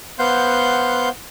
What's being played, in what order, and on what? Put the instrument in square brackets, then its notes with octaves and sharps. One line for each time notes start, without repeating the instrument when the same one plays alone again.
[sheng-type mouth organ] B3 C5 F5 F#5 C6 G6